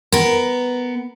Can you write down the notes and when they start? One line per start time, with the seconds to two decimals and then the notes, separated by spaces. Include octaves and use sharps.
0.12 B3 A#4